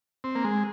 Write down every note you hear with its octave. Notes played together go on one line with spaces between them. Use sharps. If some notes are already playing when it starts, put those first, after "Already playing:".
C4
A#3
G#3